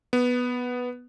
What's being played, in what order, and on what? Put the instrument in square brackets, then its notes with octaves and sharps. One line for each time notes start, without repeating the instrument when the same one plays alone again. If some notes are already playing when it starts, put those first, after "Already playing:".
[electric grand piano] B3